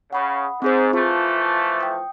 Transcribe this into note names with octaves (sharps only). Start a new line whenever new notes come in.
C#3 F#5 B5 D#6
G#2 C4 G#4 C5
E3 F3 A3 F4
G5 D#6